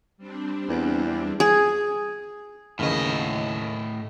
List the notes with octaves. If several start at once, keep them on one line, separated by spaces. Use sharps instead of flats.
G3 C4 D4
E2
G#4
D#2 A2 C#3 E3 D#5